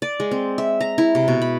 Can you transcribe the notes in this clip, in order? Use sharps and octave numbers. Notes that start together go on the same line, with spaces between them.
D5
G#3
C4
E5
A#5
E4
C3
B2
B5